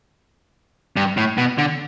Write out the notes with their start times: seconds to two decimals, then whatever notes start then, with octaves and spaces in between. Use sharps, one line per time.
0.96 G2
1.17 A2
1.38 B2
1.58 D3